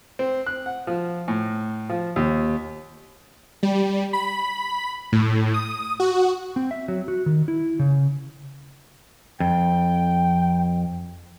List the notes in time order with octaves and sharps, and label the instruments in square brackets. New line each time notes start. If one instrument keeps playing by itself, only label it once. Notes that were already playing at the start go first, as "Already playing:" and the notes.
[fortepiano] C4
F#6
F#5
F3
A2
F3
D#2
[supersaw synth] G3
B5
A2
D#6
F#4
[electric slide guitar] C4
E5
F#3
F#4
D#3
E4
C#3
[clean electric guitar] F2 [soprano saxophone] G5